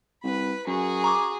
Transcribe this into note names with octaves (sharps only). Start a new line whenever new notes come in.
C2 B4 B5
F#2 F#4 G#4
A#5 C#6 D6